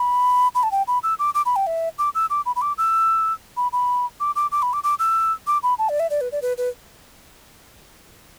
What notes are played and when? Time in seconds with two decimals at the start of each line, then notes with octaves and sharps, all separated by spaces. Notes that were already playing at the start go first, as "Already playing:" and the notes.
Already playing: B5
0.55 B5
0.63 A5
0.71 G5
0.87 B5
1.03 E6
1.19 D6
1.34 D6
1.46 B5
1.56 G5
1.67 E5
1.98 D6
2.15 E6
2.30 D6
2.46 B5
2.56 B5
2.61 D6
2.78 E6
3.57 B5
3.72 B5
4.20 D6
4.36 D6
4.52 D6
4.62 B5
4.73 D6
4.83 D6
4.99 E6
5.47 D6
5.63 B5
5.78 A5
5.89 D5
5.99 E5
6.10 D5
6.21 B4
6.32 D5
6.42 B4
6.57 B4